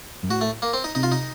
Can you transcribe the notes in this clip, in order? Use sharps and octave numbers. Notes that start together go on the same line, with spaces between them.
F#2
A2 F#4
A3
A#3
C4
D#4
C3 D#4
F4
D#4